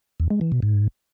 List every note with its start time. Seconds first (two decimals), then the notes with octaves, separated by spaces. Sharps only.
0.20 E2
0.30 G#3
0.41 E3
0.52 B2
0.62 G#2